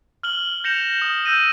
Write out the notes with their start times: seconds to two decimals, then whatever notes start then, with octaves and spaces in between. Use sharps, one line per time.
0.23 F6 F#7 G7
0.64 G6 A#6 C#7 E7 F7
1.02 D#6
1.25 E6 G6 A#6 D#7